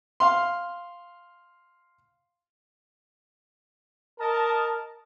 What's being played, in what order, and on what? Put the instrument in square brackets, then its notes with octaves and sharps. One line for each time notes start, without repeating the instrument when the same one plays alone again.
[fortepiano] F5 C6
[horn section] A#4 D#5 A5